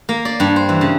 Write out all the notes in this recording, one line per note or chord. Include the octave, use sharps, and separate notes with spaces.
A#3
D5
G2
C5
E3
C#3